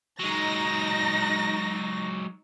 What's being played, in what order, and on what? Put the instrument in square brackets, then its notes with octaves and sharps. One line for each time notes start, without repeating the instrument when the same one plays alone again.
[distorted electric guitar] F#3 G#3 [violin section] D#4 A#6